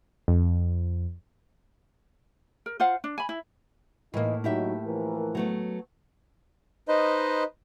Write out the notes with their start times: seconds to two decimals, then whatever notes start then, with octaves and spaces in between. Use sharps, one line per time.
0.28 F2
2.66 A#4
2.80 F4 C5 F5 F#5
3.04 D4
3.18 G#5 B5
3.29 E4
4.14 A2 E3 A#3 D#4
4.44 F#3 D#4 E4 G4 E5
4.86 E3 F3 A#4
5.35 F#3 A3 B3
6.88 D#4 B4 C5 D#5